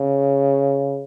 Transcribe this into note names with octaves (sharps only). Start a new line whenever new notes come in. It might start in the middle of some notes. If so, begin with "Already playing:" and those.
Already playing: C#3